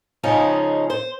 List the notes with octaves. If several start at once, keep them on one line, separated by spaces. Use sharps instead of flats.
C#3 F3 G#3 C#4 D#4 G#4
C5